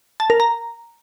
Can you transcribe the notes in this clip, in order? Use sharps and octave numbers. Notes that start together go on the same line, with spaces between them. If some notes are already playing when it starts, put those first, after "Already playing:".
A5
A#4
A#5